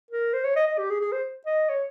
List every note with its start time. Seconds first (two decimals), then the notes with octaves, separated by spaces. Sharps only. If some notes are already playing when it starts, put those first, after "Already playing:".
0.11 A#4
0.33 C5
0.44 C#5
0.56 D#5
0.67 D#5
0.78 G4
0.90 G#4
1.01 G#4
1.12 C5
1.46 D#5
1.69 C#5